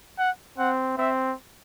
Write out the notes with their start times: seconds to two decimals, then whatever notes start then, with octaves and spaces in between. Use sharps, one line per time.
0.18 F#5
0.58 C4 F#5
0.97 C4 E5